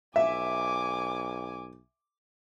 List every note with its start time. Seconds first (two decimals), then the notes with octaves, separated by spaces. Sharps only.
0.16 B1 E5 G#5 D6